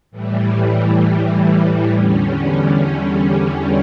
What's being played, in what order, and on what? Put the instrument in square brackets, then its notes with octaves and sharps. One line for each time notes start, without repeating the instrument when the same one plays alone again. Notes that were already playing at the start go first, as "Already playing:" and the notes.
[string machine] A2 E3 G3
E2 D3 G3 C#4